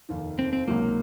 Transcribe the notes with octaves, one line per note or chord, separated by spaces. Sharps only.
F1 D#2 D#3
C4
C4
C#2 C3 D#3 F#3 A#3